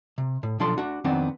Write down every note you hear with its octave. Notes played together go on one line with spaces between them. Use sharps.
C3
A2
B1 F3 D4 F4 A4 C6
D4 F#4
F2 D#3 B3 C4 D4 F#5